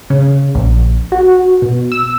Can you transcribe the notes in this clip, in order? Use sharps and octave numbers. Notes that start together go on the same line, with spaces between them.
C#3
A#1
F#4
B2
E6